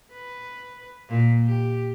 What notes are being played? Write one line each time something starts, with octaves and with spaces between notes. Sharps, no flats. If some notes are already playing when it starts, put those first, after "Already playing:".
B4
A#2
G4